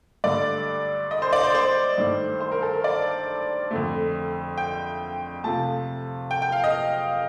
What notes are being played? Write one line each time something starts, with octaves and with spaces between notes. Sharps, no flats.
G2 D3 A3 D5
D#5
C5
D5
C5
C5
G2 D#3 A3
C5
A#4
A4
A#4
D5
F2 D3 A3
G5
C3 F3 A3 A5
G5
G5
F5
D#5